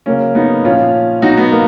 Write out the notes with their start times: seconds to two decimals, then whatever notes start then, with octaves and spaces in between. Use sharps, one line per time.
0.06 C#3 F#3 A#3 C#4
0.35 B3 D#4
0.64 A#2 F3 C#4 F4
1.22 B2 F#3 D#4 F#4
1.37 B3
1.51 A#3